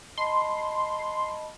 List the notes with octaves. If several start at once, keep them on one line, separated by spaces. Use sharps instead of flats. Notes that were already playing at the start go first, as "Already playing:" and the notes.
D#5 A5 B5 C6